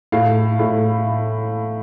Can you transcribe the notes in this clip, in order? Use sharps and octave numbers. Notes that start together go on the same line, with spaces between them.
A2 F5
A2